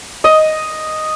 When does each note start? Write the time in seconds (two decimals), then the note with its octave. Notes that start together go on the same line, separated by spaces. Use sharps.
0.24 D#5